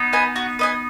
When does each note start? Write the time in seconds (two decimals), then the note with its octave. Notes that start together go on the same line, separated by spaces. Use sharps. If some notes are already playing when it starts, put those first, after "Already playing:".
Already playing: B3 D#4
0.13 B4 D#5 G#5
0.36 F#4
0.59 B4 D#5 G#5